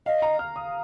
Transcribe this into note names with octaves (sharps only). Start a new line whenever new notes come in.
D#5 F5
A#5
F6
D#6